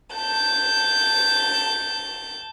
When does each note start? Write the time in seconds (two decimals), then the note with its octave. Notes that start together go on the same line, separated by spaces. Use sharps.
0.13 A5 G6